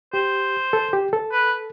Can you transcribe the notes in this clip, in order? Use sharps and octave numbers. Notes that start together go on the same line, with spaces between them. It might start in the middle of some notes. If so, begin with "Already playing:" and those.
G4 C5
A4
G4
A4
B4